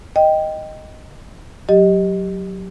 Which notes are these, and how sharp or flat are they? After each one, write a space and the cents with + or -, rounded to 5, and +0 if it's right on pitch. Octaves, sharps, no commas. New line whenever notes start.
D#5 +0 G5 +0
F#3 +0 G4 +0 D#5 +0